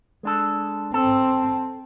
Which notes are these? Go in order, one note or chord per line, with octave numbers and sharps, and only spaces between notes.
G#3 D4 A4
C4 A4